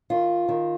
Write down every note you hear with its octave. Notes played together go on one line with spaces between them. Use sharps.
D#3 F4
D#3